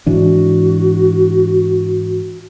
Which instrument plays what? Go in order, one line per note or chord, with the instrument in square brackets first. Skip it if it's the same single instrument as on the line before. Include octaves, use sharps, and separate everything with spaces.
[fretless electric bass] G#2 E3 D4 [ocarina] F#4